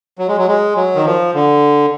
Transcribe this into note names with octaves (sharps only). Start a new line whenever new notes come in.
F#3
G#3
F#3
G#3
F#3
D#3
F3
D3